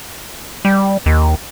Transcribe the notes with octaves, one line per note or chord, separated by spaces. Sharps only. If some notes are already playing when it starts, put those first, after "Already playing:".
G3
D#2